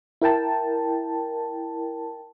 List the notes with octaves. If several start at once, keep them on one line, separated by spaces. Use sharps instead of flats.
E4 A#4 G5 A5